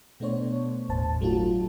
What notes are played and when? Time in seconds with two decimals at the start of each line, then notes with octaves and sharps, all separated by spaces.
0.20 B2 A3 B3 D4 C5 C#5
0.89 G1 D#2 A2 C5 A5
1.21 F#3 A3 D4 D#4 F4 F#4